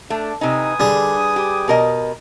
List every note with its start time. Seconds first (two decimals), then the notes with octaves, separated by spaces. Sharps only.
0.10 A3 D4
0.41 C3 D#4 B4 G#5 D#6
0.80 D3 G3 G#4
1.36 G4
1.68 B2 A#4 D#5